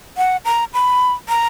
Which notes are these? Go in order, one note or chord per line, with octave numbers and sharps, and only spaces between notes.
F#5
A#5
B5
A#5